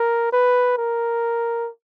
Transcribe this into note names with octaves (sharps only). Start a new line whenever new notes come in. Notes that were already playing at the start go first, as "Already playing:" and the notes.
Already playing: A#4
B4
A#4